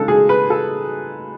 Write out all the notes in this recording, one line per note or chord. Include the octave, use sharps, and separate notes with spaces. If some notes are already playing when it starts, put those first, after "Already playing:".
Already playing: C#3 G#3 D#4 A4
G#4
B4
A4